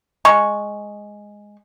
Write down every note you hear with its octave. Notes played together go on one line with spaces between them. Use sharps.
G#3 C#6